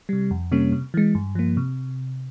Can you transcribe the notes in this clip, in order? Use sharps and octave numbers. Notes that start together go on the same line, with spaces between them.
C3 G3
F2
C3 G3 A#3 C#4
C3
E3 G#3
G2
F3 A#3
C3